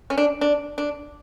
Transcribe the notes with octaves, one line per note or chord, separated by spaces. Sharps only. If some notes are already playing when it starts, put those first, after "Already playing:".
C#4
D4
D4
D4